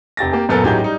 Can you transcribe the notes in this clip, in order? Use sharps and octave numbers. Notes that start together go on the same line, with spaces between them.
F1 G4 A6 A#6
A#3 G4
D#1 F#2 B3 A4 A#4 A6
A1 F#3 D#4 G4 G#4 G6
G3 D#4